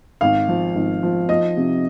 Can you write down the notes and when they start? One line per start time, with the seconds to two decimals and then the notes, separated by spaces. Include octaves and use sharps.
0.21 G#1 F5
0.48 F3
0.76 G#1
1.03 F3
1.29 F3 D#5
1.57 C3